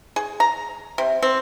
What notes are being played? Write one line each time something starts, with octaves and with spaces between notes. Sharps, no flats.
G#4
A#5
C3
C4